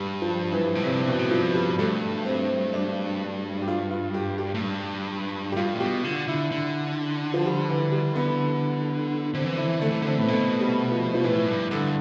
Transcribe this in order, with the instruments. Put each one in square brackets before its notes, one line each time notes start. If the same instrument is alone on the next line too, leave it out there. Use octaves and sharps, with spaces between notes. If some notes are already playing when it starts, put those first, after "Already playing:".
Already playing: [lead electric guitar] G2 [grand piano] G3
[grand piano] F3
E3
[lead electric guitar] A2
[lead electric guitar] G2 [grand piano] C3
[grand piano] B2
[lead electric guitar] A2
[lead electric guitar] G2 [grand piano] F3
[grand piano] G3
[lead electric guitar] G2 [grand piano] A3
[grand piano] C4
D4
G4
F4
F4
G4
G4
[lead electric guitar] A2
G2
[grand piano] G4
[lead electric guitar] G2 [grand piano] F4
[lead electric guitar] A2
[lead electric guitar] B2 [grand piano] G4
[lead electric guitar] D3 [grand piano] F4
[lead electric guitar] D3 [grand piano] E4
[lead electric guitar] D3
[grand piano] F3
G3
E3
G3
B3
[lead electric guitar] D3 [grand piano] C4
[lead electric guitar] E3
[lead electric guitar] D3 [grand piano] E4
[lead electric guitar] E3
[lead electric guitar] D3 [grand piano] A3
[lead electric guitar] E3
[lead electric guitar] D3 [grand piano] C4
[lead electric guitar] A2 [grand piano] B3
[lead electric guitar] B2 [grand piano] A3
[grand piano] G3
F3
F3
[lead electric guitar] A2 [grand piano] E3
[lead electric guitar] G2
[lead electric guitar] G2 [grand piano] D3